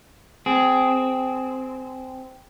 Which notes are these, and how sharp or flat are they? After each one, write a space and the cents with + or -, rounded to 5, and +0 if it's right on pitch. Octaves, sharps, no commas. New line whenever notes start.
C4 -15 G#4 +10